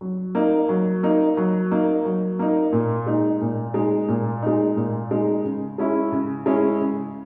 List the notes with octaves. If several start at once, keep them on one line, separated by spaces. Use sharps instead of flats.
F#3
A#3 D#4
F#3
A#3 D#4
F#3
A#3 D#4
F#3
A#3 D#4
A#2
G#3 D#4
A#2
G#3 D#4
A#2
G#3 D#4
A#2
G#3 D#4
C#3
G#3 C#4 E4
C#3
G#3 C#4 E4
C#3